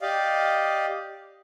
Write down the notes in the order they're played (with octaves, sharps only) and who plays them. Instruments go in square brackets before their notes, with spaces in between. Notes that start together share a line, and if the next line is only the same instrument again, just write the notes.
[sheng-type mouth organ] G4 D5 D#5 F5